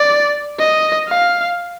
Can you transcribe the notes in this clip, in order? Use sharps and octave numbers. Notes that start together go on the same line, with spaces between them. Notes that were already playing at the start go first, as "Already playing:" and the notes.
Already playing: D5
D#5
F5